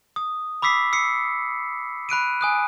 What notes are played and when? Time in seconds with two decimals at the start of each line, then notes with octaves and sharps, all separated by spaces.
0.16 D#6
0.62 B5 D6 E6 B6 C7
0.93 E6 C7 C#7
2.09 B5 F#6 D7 D#7
2.41 G#5 D#6 F#6